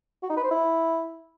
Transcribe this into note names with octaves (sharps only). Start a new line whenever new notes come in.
F#4
D#4
B4
C5
E4